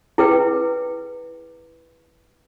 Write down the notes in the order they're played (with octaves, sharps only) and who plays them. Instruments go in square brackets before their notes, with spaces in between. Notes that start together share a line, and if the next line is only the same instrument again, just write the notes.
[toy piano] E4 G#4 B4 G5